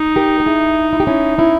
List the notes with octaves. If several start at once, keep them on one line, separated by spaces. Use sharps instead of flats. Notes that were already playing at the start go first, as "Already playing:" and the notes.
Already playing: D#4
G4 A#4
G4
E4 G#4
E4
G4
C#4 E4
C#4 E4